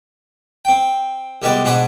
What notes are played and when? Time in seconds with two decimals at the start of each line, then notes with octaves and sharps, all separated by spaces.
0.65 C4 G5
1.42 C2 G3 G#3 B3 B4 D5
1.64 G#2 B2 D4 G#4 F#5 B5